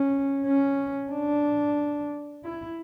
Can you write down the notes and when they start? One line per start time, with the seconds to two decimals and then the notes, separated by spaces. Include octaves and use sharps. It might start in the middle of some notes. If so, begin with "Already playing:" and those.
Already playing: C#4
0.46 C#4
1.11 D4
2.44 E4